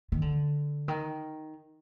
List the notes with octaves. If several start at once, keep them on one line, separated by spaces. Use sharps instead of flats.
D#3
D3
D#3